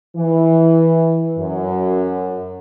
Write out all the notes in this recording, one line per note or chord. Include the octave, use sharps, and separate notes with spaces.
E3
F#2